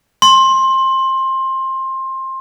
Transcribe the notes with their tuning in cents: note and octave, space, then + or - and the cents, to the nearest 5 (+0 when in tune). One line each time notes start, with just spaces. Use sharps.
C6 +20